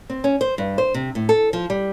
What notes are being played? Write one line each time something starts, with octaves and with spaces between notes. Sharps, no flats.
C4
C#4
C5
G2
C5
C3
A2
A4
F3
G3